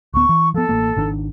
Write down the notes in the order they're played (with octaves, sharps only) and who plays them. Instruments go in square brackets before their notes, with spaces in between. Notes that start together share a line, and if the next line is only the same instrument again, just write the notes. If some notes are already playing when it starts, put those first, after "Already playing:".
[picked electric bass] D1 D2 B3 [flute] C#6
[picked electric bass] E3
[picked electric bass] F3 B3 [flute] A4
[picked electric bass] A1 A#3
G#1 D#3 D4